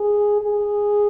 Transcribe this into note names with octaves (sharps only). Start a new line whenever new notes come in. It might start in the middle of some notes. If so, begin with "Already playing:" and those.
Already playing: G#4
G#4